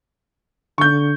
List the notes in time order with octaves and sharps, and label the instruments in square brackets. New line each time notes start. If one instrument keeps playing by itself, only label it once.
[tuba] D3 [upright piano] C#6 G6